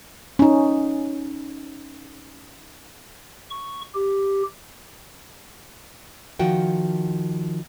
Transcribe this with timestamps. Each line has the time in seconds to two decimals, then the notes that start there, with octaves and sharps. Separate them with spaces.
0.39 C#4 D#4
3.50 C#6
3.94 G4
6.39 D#3 F3 F#4 F#5 G5